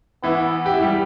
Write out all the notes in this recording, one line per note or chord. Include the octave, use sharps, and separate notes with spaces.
E3 B3 E4
G4
E4
G3 G4